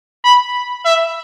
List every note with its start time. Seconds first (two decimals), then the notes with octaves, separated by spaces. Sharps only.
0.25 B5
0.85 E5